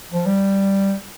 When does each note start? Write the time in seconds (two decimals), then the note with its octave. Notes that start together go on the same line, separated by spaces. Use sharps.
0.13 F3
0.26 G3